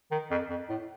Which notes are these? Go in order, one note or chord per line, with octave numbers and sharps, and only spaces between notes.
D#3
F2
F2
A2